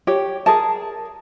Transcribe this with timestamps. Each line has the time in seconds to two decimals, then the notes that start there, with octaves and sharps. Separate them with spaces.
0.07 G4 C#5
0.46 G#4 A#4 A5